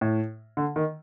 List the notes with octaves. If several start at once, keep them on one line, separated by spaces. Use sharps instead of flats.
A2
D3
D#3